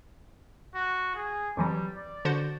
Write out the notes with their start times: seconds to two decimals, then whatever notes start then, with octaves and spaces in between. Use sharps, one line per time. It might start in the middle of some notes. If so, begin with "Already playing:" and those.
0.75 F#4
1.16 G#4
1.57 F2 E3 F#3 G3
1.96 D5
2.25 D3 F#4 C5